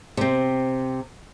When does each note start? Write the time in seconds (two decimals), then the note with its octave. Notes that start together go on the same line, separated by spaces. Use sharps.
0.17 C3 C4